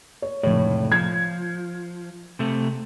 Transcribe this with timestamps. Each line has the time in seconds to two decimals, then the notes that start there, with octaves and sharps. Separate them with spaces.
0.22 C#5
0.43 F1 C#2 A2 C#5
0.92 F3 G#6
2.39 C3 A3